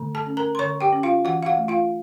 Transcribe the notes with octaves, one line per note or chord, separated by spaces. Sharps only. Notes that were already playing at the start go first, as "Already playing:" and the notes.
Already playing: D3 A3
A4 A5
C#4
A#4 A#5
C6
D3 C#5 C#6
G4 G5
C#4
F4 F5
E3 F#4 F#5
F5
F#4 F#5
A3
F4 F5